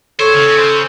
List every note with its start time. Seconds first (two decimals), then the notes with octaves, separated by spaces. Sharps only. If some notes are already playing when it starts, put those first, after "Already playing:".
0.20 A4 C5 C#5
0.34 C#3
0.57 C5